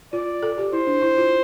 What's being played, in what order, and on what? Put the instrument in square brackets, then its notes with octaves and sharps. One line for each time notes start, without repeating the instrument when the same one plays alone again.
[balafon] F4 [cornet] D5
[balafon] A4
G4
[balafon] E4 [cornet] C5
[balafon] D4
E4
F4